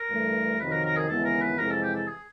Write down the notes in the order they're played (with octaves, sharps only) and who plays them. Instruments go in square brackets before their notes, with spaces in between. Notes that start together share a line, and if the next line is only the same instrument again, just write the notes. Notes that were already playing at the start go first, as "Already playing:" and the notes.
Already playing: [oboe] A#4
[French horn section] G2 E3 A3
[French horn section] F2 C3 D#3 F#3 [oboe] B4
[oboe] A#4
A#4
G#4
[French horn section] D#2 C#3 E3 G#3 B3 [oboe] A4
[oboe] A#4
B4
[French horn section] F2 C3 E3 G#3 [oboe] A#4
[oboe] A4
G4
A4
G#4